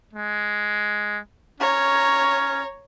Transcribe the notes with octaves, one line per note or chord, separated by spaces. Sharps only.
G#3
C#4 C#5 A#5